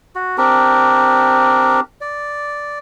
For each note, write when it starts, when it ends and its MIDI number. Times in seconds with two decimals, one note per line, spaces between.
0.15 0.37 66
0.38 1.80 60
0.38 1.80 62
0.38 1.80 67
0.38 1.80 70
2.01 2.79 74